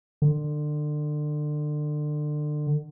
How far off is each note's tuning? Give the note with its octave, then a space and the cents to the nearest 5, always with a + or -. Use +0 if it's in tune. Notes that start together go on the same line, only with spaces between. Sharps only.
D3 +30